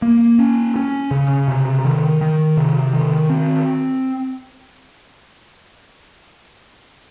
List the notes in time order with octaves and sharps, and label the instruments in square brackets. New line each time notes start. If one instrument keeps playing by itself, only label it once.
[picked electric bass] A#3
C#4
C#4
C#3
C3
D#3
D#3
C3
D#3
C4